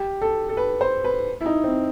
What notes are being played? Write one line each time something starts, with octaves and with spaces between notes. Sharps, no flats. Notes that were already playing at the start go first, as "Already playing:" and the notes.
Already playing: G4
A4
A4
B4
C5
B4
E4
D#4
C4